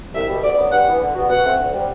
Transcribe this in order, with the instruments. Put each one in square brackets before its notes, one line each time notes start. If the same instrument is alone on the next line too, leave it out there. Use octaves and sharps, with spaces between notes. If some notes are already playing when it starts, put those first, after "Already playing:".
[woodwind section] C2 [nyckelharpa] E5
[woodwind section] B2 G3
[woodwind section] D2 [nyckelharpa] D5
[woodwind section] D3 F#3 B3
[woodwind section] G2 [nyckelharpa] F#5
[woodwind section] E3 B3
D3
G3 B3 F#4
[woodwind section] B2 [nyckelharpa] F#5
[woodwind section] A3 C4
D2
C3 G3